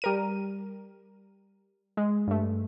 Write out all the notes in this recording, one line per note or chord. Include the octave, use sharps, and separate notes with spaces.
G3 A#4 D#7
G#3
G2 A3